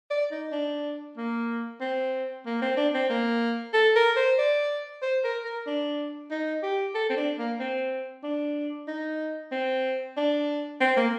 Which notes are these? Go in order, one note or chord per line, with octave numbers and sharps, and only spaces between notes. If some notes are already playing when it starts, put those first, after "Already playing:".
D5
D#4
D4
A#3
C4
A#3
C4
D4
C4
A#3
A4
A#4
C5
D5
C5
A#4
A#4
D4
D#4
G4
A4
C4
D4
A#3
C4
D4
D#4
C4
D4
C4
A#3